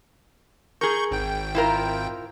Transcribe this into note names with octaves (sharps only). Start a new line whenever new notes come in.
G#4 A#4 C#6 G6
G#1 G5
E4 F4 A#4